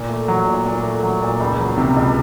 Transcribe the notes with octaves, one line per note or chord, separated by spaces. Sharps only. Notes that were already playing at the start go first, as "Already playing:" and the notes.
Already playing: A#2
A3
F#3
A#2
A#2
A3
F#3
A#2
C#2
F#3
C3
C#2